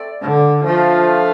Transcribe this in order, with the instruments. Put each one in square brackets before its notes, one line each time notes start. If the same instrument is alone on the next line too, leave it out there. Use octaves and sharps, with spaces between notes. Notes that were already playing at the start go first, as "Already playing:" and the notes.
Already playing: [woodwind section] A3 C4 A4 D5
[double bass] D3
[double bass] F3 [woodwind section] A3 D4 F4